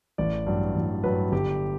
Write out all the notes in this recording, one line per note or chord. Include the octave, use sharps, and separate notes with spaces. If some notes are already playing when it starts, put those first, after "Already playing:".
A1 D5
G2 F#3
A1
G2 F#3 B4
G1 G4